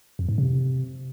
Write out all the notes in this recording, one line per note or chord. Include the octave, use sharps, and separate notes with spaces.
F2
G#2
C3